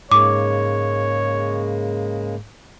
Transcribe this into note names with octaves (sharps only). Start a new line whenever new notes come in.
G#2 C#3 G#3 A#3 C#5 D6